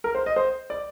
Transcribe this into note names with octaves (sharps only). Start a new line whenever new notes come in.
A#4
C5
D#5
C5
D5